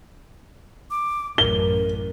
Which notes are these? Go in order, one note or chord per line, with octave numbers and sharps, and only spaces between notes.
D6
A1 F#2 A#4 G7